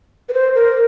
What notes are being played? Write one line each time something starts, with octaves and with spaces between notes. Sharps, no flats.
B4
C5
A#4